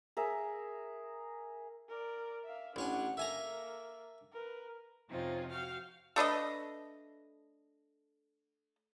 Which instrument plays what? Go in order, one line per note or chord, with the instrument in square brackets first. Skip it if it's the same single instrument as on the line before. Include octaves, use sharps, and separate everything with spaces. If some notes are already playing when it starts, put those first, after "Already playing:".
[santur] G#4 A#4 E5
[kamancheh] A#4 D5
E5 F5
[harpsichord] A1 C#5 G#5 [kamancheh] D4 F#5
[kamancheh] A#3 A4 [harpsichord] E5 G#5 A#5
[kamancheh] A#4 B4
[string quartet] F2 C3 C4 C#4 D#4 F4
F#4 F5 G5 F6
[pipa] A3 D4 B4 D#5